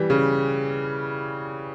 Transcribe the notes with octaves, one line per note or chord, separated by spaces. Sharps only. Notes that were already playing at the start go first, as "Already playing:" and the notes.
Already playing: E3 G3
C#3